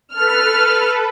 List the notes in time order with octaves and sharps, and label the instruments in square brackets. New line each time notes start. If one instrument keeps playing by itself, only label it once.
[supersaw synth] A4 B4 [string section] F6